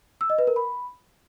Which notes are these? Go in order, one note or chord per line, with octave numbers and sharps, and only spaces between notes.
E6
D#5
B4
A#4
B5